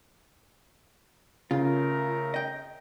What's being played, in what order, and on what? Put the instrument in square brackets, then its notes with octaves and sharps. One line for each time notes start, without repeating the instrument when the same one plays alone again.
[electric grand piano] C#3 [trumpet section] A3 A#4 [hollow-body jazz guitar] F4
[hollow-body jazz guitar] D#5 G5